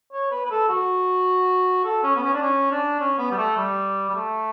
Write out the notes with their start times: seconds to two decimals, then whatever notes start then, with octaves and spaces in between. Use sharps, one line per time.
0.12 C#5
0.31 B4
0.45 B4
0.51 A4
0.69 F#4
1.85 A4
2.04 C#4
2.16 B3
2.23 C#4
2.34 D4
2.42 C#4
2.71 D4
3.00 C#4
3.18 B3
3.31 G3
3.37 A3
3.57 G3
4.10 G3
4.14 A3